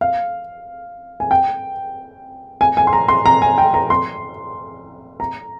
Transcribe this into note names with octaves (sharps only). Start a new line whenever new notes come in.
F5
G#5
G5
G#5
G#5
C6
A#5
C6
A#5
G#5
G5
A#5
C6
A#5